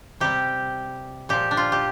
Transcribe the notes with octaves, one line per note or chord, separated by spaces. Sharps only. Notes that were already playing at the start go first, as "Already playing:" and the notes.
C3 G3 G4
A#2 F3 G4
D4
F4
G4